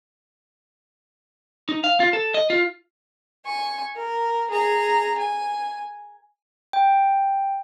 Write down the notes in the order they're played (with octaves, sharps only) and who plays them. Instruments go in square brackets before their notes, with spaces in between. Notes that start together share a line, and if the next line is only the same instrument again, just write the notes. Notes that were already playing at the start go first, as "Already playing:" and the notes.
[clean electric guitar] D#4
F5
F4
A4
D#5
F4
[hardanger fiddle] G#5 C#6
A#4
G#4 A#5
G#5
[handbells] G5